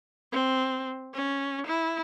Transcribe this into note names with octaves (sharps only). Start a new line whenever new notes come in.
C4
C#4
E4